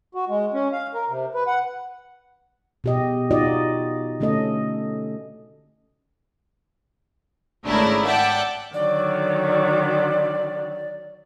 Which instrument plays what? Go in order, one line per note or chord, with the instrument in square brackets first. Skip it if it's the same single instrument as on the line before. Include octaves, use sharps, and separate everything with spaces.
[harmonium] F#4
G#3
C#4
F5
A#4
C3
B4
F#5
[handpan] B2 G4 D#5
D#4 F4 F#4 D5 D#5
D3 A3 C#4 A4 D#5
[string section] G#1 C#3 A3 D4 E4 A#4
D5 E5 F#5 G5 A5
[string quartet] D3 D#3 F#3 [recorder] D5